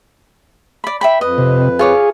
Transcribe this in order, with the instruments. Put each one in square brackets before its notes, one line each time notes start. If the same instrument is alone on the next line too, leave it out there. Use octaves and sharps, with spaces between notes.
[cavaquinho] D5 B5
E5 G5 B5
[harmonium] F2 B4 [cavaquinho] D#5
[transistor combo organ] C3
[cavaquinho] F4 C#5 D6 [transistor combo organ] G#4